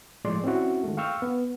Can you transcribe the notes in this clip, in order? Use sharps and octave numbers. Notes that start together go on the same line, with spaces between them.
A2 F3 G#3 D5 C6
C4 C#4 E4 F#4
D#3 G#3 A3
F5 G5 C#6 E6 F6
B3